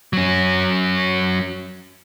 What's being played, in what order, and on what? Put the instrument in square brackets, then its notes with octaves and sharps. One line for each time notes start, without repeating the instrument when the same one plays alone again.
[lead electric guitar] F#3 C#4